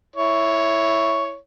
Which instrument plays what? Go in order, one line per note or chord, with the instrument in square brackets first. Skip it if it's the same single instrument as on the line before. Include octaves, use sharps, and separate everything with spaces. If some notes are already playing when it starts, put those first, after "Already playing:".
[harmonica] E4 C#5